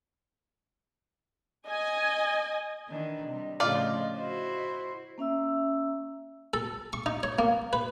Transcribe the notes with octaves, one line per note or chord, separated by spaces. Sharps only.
D#5 G#5
D#3 E3 D4 D#5
C3 G3
A2 C#3 F3 F4 D5
E4 F#4 C5
A#3 C#4 E5 E6
A4
C#6
D#4
C#5
A#3
B4